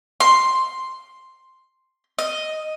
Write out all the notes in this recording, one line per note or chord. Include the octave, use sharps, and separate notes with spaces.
C6
D#5